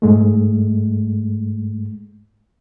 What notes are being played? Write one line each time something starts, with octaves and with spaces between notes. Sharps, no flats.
G#2 G#3 A3